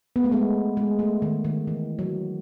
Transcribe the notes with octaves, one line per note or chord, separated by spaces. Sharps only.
B3
A3
G#3 B3
G#3
A3
D#3
D#3
E3
F#3